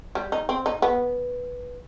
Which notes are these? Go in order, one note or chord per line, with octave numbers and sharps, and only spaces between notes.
G3
D#4
C4
D#4
B3